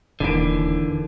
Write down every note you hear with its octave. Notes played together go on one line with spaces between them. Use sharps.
E1 D#2 D3 E3 D7